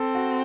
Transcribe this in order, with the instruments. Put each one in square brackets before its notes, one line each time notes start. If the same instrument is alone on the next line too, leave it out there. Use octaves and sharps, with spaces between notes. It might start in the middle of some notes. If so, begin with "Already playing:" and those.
Already playing: [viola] C4 [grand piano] A4
[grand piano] F#4